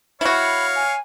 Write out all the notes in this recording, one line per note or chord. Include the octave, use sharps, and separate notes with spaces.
E4 F#4 C#5 F5 B5
G#5